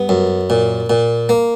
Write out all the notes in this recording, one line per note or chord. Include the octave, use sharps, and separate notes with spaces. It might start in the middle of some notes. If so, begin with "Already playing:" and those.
Already playing: G2 B3
F#2
A#2
A#2
A#3